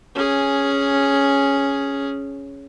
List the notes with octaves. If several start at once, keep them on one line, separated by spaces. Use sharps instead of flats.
C#4 G#4